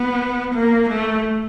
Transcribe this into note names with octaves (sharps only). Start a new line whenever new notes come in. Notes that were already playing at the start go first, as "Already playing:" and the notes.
Already playing: B3
A#3
A3